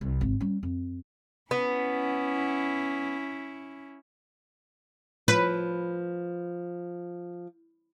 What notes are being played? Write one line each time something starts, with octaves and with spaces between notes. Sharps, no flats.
C2
G#1
G3 C#4
F2
B3 C#4 E4
F3 B4